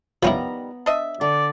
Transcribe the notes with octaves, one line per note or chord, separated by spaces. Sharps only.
D#3 F3 G3 B3 C#4 E4 A#5
D4 D#5 E5
D3 D5